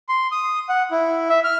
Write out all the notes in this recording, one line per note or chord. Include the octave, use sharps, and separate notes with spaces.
C6
D#6
F#5
E4
E5
F6